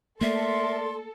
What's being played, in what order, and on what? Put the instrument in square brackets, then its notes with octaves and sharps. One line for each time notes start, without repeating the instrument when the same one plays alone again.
[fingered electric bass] A3 A#3 [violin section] A4 [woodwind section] A#4 D5 C6 [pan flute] E5